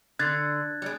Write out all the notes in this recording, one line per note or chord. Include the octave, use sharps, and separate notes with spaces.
D3 F#6 G#6 A6
G3 G#3